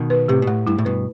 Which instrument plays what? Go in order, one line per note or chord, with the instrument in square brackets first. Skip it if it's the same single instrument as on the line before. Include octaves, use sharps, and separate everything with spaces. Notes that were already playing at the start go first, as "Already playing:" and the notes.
Already playing: [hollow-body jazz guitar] B2 D#3
[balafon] B4
[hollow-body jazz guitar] A2 C3 [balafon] G4
[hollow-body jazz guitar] B2
[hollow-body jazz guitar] A2 [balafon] A3
[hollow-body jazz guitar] G2 [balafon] E4
[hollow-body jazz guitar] A2
[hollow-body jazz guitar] G2 B2 [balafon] B4